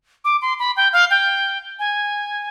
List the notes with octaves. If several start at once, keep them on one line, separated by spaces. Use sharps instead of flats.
D6
C6
B5
G5
F5
G5
G#5